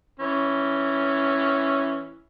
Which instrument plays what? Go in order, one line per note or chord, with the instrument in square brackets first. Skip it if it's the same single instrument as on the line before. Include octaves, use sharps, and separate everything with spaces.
[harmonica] E3 C#4